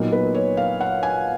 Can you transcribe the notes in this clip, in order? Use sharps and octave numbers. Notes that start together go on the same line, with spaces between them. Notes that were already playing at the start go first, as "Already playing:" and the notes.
Already playing: A#2 F#3 B3 D#4 A#4
B4
C#5
F5
F#5
G#5